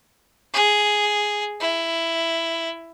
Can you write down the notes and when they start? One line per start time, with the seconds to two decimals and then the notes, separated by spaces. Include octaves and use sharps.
0.53 G#4
1.60 E4